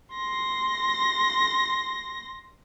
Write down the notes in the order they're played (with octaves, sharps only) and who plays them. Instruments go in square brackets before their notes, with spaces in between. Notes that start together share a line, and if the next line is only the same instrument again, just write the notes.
[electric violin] C6 A#6